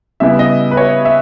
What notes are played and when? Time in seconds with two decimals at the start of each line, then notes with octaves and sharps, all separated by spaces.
0.20 C#3 G3 B3 E4 E5
0.39 D#5
0.71 B4
0.77 C#5
1.05 E5